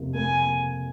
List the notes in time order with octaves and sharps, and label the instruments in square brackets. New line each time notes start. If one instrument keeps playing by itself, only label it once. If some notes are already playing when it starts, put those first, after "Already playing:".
Already playing: [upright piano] F2 C3 A#3
[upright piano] A#3 [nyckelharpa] G#5